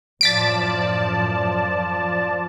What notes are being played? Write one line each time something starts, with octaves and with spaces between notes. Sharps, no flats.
F#2 A2 F3 D5 A5 A6 B6 D7